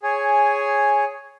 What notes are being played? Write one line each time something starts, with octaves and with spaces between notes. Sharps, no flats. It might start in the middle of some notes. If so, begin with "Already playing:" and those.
G#4 C#5 G#5